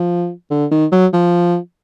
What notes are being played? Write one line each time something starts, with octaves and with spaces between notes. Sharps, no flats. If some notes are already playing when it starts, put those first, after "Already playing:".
Already playing: F3
D3
D#3
F#3
F3